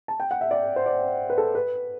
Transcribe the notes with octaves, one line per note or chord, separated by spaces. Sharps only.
A5
G5
F#5
E5
D5
C5
D5
B4
A4
B4